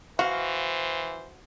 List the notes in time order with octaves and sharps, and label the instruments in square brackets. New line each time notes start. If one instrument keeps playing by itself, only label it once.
[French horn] E3 [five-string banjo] F#4 [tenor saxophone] C5 [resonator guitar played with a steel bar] F5